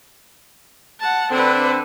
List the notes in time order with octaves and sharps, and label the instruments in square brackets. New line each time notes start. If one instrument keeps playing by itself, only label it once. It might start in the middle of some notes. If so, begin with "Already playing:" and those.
[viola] F#5 A5
[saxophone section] D3 C4 [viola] D4 B4